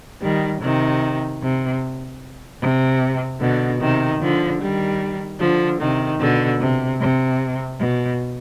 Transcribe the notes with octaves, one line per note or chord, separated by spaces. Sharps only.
D#3 G3
C3 D#3
C3
C3
B2 D3
C3 D#3
D3 F3
D#3 G3
D3 F3
C3 D#3
B2 D3
C3
C3
B2